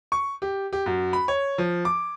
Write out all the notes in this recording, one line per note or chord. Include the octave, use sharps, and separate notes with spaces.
C#6
G4
G4
F#2
B5
C#5
F3
D6